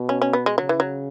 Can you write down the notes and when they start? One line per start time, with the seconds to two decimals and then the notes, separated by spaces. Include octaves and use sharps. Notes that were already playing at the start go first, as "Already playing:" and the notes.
Already playing: B2
0.09 C#4
0.22 C#4
0.33 B3
0.46 G#3
0.58 C#3 F#3
0.69 E3
0.80 F#3